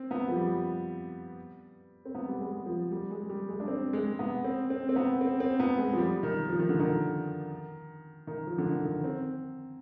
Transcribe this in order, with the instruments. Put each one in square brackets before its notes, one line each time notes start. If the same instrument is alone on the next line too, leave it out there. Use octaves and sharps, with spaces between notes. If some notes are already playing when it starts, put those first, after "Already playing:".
Already playing: [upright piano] C4
B3
F3
G3
C4
B3
G3
G#3
F3
G3
G#3
G3
G#3
D4
C4
G#3
B3
C4
C4
C4
B3
C4
C4
B3
G#3
F3
G3
D#3
F3
D#3
D3
D#3
D#3
F3
D3
D#3
D#3
C4